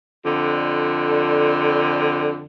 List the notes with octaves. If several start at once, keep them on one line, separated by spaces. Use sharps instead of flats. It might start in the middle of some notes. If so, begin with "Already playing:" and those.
F2 D3